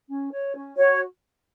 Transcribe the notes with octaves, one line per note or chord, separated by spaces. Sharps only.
C#4
C#5
C#4
F#4 C#5